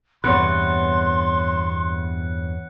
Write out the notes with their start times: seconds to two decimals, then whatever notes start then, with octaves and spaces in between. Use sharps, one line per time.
0.24 E2 G2 C3 B3 C#5 C6 F#6 C#7